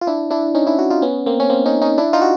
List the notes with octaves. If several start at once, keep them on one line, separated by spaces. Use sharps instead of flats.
F4
D4 E4
D4 E4
C#4 D#4
D4 E4
E4 F#4
D#4 F4
B3 C#4
A#3 C4
C#4
A#3 C4
C#4 D#4
C#4 D#4
D4 E4
D#4 F4
F#4